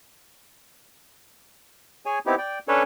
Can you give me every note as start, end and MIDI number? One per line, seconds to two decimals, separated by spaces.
2.06 2.19 68
2.06 2.19 73
2.06 2.19 80
2.26 2.36 59
2.26 2.36 60
2.26 2.36 63
2.26 2.36 64
2.26 2.36 67
2.38 2.59 74
2.38 2.59 79
2.68 2.83 61
2.68 2.83 62
2.68 2.83 69
2.68 2.83 71
2.68 2.83 73